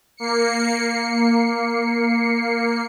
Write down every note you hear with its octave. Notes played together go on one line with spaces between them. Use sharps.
A#3 C7 C#7